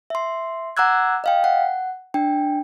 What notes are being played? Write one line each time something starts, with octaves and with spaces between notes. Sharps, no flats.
E5 C6
F#5 A#5 D6 E6 F#6 G#6
D#5 F5 G5
F#5
D4 G5